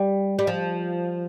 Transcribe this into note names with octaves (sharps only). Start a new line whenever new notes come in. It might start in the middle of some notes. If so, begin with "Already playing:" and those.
Already playing: G3
G3
F3